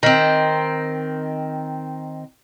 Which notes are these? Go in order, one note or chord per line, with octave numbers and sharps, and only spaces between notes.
D#3 C4